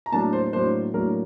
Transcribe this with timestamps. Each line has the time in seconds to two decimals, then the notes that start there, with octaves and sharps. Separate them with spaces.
0.06 A#5
0.12 A2 F#3 A#3 D4 A5
0.33 C5
0.53 A2 F#3 A#3 D4 C5
0.94 A2 F#3 A#3 D4 A#4